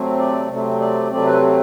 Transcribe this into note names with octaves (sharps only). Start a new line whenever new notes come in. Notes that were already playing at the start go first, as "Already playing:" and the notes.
Already playing: C3 F#3 A3 C4
D5
C3 F#3 A3 C4
D5
C3 F#3 A3 C4 D5
B4